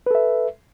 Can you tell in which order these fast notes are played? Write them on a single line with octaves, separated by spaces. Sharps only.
B4 A4 E5